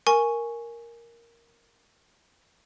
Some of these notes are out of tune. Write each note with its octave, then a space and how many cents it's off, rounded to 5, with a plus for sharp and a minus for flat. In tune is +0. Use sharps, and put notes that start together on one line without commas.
A#4 +0 G#5 +0 C#6 +0